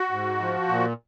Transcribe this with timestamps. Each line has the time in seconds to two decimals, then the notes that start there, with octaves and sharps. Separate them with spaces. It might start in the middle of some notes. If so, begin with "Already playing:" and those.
Already playing: F#4
0.11 G#2
0.40 F3
0.69 A#2